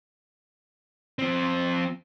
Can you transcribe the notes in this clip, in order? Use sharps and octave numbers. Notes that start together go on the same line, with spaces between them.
F3 C4